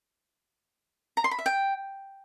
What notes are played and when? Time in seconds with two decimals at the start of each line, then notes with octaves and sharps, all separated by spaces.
1.17 A#5
1.24 C6
1.31 B5
1.39 E5
1.46 G5